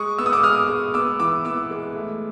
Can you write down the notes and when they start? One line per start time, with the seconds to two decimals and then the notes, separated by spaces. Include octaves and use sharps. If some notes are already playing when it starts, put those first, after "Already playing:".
Already playing: G#3 C#6 D#6
0.18 B3 E6
0.26 D#6
0.33 D6 E6
0.43 G#3 D#6 F6
0.69 G#3
0.94 B3 D6 E6
1.20 E3 D6 E6
1.45 B3 D6 E6
1.70 G#3
1.96 A3